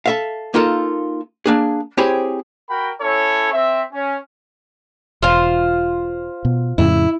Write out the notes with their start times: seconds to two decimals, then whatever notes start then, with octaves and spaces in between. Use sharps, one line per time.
0.06 A4 E5 F5
0.54 A#3 D#4 F4 A4 A#4
1.46 A#3 D4 G#4
1.97 C4 E4 G4 G#4 C5 C#5
2.68 F#4 A#4 G5 B5
3.01 C#4 E4 A4 C#5
3.52 C4 E5
3.92 C#4
5.22 E1 F4 C5 F5
6.45 B2
6.78 F2 A2 C#3 E4